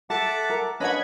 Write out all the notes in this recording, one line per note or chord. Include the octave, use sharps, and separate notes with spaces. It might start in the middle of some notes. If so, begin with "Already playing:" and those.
A4 E5 F#5 A5 D6
A#4
C#4 D4 B4 D#5 F#5 B5 F#6 G#6